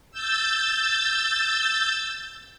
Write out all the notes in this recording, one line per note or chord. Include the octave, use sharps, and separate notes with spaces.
E6 G6 A6